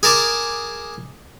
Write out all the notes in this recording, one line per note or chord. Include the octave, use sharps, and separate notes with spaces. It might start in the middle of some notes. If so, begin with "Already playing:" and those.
G#4 A#4 A5 D6